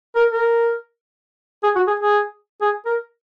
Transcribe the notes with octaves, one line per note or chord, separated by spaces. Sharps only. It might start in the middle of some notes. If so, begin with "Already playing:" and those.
A#4
A#4
G#4
F#4
G#4
G#4
G#4
A#4